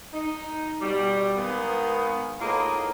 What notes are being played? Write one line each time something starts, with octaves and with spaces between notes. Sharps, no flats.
D#4
B2 G3
D#3 G#3 A#3 B3
A2 A#3 B3 D#4 F4 G#4